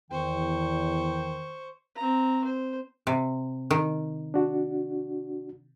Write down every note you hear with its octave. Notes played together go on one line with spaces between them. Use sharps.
E2 D#3 C5 G5 C#6
C4 A#5
C5
C3
D#3
D4 F#4